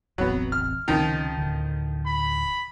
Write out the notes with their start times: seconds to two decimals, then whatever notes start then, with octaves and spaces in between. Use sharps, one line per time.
0.18 E1 A1 F#3 B3 C4
0.52 F6
0.88 C#2 C3 D#3 F3 C#4
1.38 D1 D3
2.06 B5